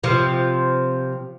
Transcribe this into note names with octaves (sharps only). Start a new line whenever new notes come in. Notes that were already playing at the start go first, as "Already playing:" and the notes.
C3 F3